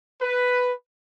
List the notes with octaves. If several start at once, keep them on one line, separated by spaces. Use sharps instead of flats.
B4